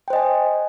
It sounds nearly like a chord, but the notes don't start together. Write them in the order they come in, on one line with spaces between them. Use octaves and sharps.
G5 C5 D#5 G#5